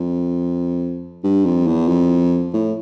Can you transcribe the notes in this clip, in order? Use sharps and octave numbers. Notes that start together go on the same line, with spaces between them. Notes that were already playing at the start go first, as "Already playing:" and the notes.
Already playing: F2
G2
F2
E2
F2
A2